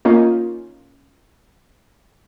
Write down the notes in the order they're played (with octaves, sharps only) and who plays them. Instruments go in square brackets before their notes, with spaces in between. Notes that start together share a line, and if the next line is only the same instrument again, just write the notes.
[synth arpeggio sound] A#3 C#4 D#4 F4